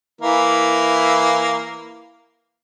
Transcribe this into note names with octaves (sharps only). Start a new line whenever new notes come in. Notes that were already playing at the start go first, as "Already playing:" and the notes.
E3 A#3 E4